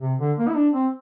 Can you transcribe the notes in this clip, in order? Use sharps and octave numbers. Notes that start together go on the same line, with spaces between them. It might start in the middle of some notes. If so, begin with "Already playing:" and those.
C3
D3
A#3
E4
D4
C4